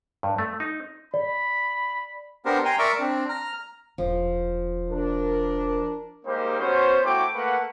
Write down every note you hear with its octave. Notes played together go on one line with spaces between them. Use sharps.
G2
A3
D#4
D5 B5
B3 D4 G4 A#4 C5
G5 G#5 A#5 C6
A#4 D5 E5 C#6 D6
C4 D4
A#5 F6
E1 F3
D4 A#4
G3 G#3 A#3 D#4 G4 C5
B3 C#4 F#4 C5
A3 E4 F#4 G5 D6
A3 A#3 B4 F#5